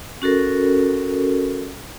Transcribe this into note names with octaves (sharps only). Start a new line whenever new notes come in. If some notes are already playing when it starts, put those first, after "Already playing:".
C#4 F#4 A4 A#4